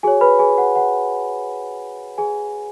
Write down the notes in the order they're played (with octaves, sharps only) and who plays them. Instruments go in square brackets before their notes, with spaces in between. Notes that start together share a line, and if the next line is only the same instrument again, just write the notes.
[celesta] F#4 G#4 G#5
C#5
B4 B5
G#4 G#5
F#5
F#5
G#4 G#5